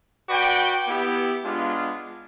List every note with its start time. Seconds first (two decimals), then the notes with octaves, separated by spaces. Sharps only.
0.29 F#4 B4 D5 G5
0.87 B3 E4 G4
1.44 G#3 B3 D4 F4